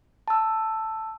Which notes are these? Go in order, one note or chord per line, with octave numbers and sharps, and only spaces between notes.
A5 E6